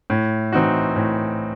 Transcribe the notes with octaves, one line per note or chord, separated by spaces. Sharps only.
A2
E3 C4 D#4 F#4
A2